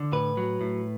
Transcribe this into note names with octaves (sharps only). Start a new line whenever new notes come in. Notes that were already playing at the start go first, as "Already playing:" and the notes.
Already playing: D3
A2 B4
F#3
A2